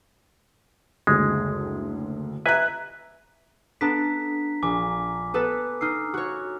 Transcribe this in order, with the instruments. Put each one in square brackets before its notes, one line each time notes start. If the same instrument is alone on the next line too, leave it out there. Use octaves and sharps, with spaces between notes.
[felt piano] F#1 D2 [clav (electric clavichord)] G#3
[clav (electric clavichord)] B4 G#5 [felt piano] E5 A#5 F#6
[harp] B3 D4 A4 [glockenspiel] A#5 B6
[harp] A#1 [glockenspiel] G#5 D6
[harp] B3 A4 B4
[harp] D#4 C7 [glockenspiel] E6 F6
[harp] F#4 C#5